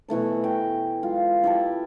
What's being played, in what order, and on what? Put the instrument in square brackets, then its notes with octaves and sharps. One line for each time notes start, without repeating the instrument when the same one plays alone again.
[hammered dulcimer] B2 E3 A3 A5
G5 A#5
G#3 F4
E4 G4 A5